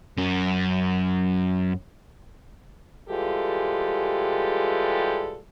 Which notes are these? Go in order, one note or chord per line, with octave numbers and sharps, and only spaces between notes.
F#2 C#4
E3 G3 G#3 F4 G4 A4